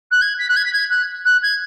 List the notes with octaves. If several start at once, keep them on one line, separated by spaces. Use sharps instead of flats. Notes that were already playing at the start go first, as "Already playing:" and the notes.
F#6
G#6
B6
F#6
G#6
B6
G#6
F#6
F#6
G#6